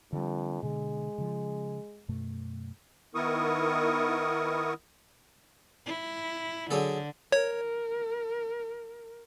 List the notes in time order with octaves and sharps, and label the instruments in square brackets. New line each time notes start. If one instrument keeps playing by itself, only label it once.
[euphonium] F2 [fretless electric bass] D3 G3
[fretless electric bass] B2 D3 [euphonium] G#3
[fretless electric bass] C#3 F3
F#2 B2 A3
[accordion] D#3 B3 E4 A#4 C#6 D#6
[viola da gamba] E4
[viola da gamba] D3 [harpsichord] F#3 G#4 A4
[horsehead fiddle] A#4 [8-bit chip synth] C#5